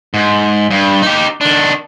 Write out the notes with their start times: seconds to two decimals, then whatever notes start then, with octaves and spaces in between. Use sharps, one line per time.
0.14 G#2
0.70 G2
1.02 D#4 G4
1.41 D#3 D4